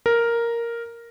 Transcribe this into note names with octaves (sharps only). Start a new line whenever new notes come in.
A#4